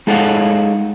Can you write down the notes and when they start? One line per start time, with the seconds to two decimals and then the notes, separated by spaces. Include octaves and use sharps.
0.07 G#3 D#4 A4 C#5 F5 F#5